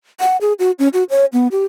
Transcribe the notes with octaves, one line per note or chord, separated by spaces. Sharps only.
F#5
G#4
F#4
C#4
F#4
C#5
B3
G4